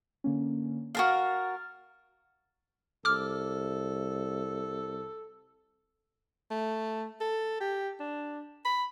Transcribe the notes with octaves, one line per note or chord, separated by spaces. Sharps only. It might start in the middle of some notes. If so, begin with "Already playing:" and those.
D3 A#3 C#4
F#4 A#4 F5 F6 A6
C2 A4 D6 F6
A3
A4
G4
D4
B5